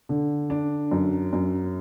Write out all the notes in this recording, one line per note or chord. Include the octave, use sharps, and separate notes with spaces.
D3
D4
F#2
F#2